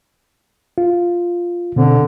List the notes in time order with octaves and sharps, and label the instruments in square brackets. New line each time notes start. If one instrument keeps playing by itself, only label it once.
[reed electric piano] F4
[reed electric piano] B2 C4 [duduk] D3